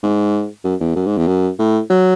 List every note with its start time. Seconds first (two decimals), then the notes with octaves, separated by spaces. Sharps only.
0.03 G#2
0.64 F#2
0.80 E2
0.96 F#2
1.07 G#2
1.17 E2
1.28 F#2
1.59 A2
1.90 F#3